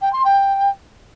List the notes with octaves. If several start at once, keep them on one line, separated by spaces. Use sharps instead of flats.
G5
C6
G5